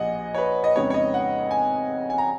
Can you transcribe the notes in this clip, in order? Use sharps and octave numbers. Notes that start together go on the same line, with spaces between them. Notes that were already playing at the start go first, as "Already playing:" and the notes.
Already playing: A#1 A#2 F3 D#5 F#5 G#5
C#5
B4
D#5
F2 C#3 G#3 B3 D#4 C#5
C#5
D#5
F#5
G#5
G#5
A#5